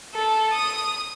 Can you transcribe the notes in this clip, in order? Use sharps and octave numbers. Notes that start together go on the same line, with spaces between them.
A4
D#6